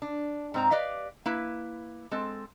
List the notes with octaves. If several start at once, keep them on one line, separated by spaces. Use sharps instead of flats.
D4
G#2 C4 A#5
G4 B4 D5 D#5 F5
A#3 E4 B4
G#3 C4 A4